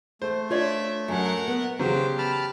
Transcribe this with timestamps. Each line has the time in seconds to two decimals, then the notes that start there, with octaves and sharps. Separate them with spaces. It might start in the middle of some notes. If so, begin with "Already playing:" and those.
0.22 A3 C5
0.50 D4 F4 C#5 D5 E5
1.08 F#2 F#3 A#4 F#5
1.48 B3
1.79 C#3 F#3 G4 C5
2.18 A5 B5 F6